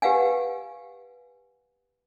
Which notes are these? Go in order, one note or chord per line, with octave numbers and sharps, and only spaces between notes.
G4 B4 F5 F#5 G#5